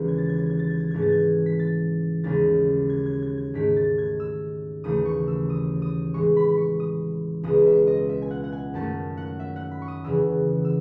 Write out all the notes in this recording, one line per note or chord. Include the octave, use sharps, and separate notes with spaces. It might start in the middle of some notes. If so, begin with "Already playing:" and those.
Already playing: D#2 C#3 E3 G#3 C#4
G#6
A6
G#6
A6
G#6
A6
G#6
A6
G#2 E3 A3 C#4 G#6
A6
G#6
B6
A6
D#2 C#3 G#3 C#4 A6
G#6
G#6
G#6
G#6
G#2 D#3 A3 B6
A6
G#6
E6
D#2 C#3 E3 A3 D#6
C#6
E6
D#6
D#6
A2 E3 G#3 C#6
B5
B5
C#6
D#6
C#2 B2 G#3 B3 D#6
E5
D#5
E5
G#5
F#5
F#5
G#5
F#2 D#3 A3 C#4 A5
F#5
E5
F#5
B5
C#6
D#6
E2 C#3 E3 E6
E6